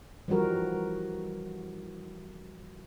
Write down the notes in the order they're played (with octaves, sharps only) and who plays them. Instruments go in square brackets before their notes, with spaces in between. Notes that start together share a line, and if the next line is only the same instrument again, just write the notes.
[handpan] E3 F3 G3 F#4 A#4